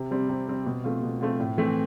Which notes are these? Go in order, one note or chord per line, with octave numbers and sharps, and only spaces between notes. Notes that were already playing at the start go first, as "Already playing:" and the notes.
Already playing: C3
G3 C4
C3
G3 C4
B2
A3 C4 F4
B2
A3 C4 F4
A2
E3 A3 C4